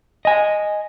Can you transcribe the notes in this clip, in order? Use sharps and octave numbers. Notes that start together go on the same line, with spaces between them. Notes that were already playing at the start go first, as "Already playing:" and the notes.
D#5 G#5